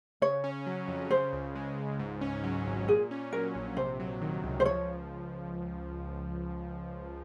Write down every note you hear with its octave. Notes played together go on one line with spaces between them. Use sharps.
C#3 C#5
C#4
F#3
F2
C#3 C5
C#2
G#3
C#2
G#2
C#4
F#3
G#1
A#2 G#4
C#4
F#3 A#4
A#1
C3 C5
F#3
D#3
C#2
C5
F3 C#5